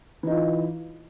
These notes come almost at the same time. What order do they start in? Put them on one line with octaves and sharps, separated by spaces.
E3 D#4 F4